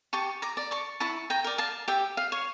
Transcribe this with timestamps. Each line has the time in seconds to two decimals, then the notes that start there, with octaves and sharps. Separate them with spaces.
0.13 G4 A5 C#6
0.42 A#5 D6
0.57 D5
0.71 A5 C#6
1.00 E4 A5 C#6
1.30 G5 A#5
1.44 A#4 D5
1.58 F5 A5
1.88 G4 E5 G5
2.17 F5
2.32 C#5